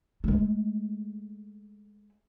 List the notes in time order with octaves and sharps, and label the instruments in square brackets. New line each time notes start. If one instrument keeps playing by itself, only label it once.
[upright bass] G#3 A3